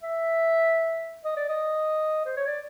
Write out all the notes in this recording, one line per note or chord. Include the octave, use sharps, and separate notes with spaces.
E5
D#5
D5
D#5
C5
C#5
D5